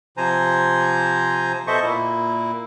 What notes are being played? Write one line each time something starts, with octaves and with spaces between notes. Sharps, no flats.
C3 F3 C5 G#5 A#5
B2 A4 C5 D#5 E5 C#6
A#2 A#3 E4